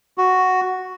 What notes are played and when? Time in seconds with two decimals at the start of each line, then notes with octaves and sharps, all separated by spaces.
0.18 F#4